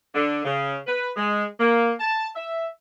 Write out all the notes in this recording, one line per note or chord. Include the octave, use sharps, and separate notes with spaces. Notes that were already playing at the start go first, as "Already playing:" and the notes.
D3
C#3
B4
G#3
A#3
A5
E5